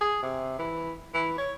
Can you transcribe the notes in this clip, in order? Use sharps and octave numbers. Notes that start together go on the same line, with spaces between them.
G#4
C3
E3
E3
C#5